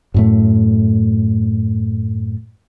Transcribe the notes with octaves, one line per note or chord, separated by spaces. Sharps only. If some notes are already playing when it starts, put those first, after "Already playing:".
F#2 A2 A3